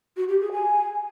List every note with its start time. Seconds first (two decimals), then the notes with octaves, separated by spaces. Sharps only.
0.17 F#4
0.29 G4
0.40 G#4
0.52 G#5